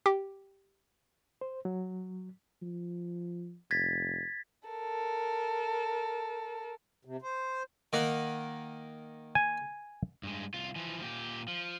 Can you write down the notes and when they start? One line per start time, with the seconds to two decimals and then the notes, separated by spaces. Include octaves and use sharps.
0.06 G4
1.41 C5
1.65 F#3
2.62 F3
3.71 F1 G#6 A6 B6
4.69 A4 A#4
7.05 C3
7.22 C5
7.93 D#3 A#3 F#5
9.35 G#5
10.23 G2 G#3
10.54 C2 F4
10.76 E3 F3
11.02 A#2 G4
11.48 F3